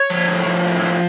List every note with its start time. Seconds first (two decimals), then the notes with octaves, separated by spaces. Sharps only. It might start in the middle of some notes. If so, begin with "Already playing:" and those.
Already playing: C#5
0.10 F3
0.28 A2
0.46 F3
0.65 A2
0.82 F3